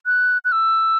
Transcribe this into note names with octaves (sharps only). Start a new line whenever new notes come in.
F#6
F#6
E6